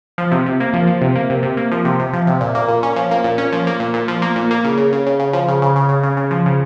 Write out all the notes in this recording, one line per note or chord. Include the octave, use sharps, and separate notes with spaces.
F3
C3
C3
A#3
F3
F3
C3
A#3
C3
C3
A#3
F3
C3
C3
F3
C3
A#2
A#3
A#2
C#4
F3
A#3
A#2
C#4
F3
A#3
A#2
A#2
F3
A#3
A#2
A#3
C#3
C#3
C#3
C#3
C#3
F3
C#3
C#3
C#3
C#3
C#3
C#3
F3
C#3